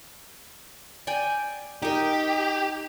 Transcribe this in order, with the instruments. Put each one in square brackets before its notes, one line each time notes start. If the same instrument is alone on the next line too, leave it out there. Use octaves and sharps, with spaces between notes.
[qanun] D5 G5 G#5
[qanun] D#4 A#4 [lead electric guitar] G4